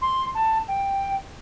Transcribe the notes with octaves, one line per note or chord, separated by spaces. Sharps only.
C6
A5
G5